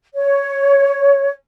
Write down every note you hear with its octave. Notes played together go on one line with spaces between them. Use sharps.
C#5